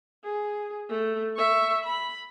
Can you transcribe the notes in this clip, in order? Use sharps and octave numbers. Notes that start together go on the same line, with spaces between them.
G#4
A3
E5 C#6
B5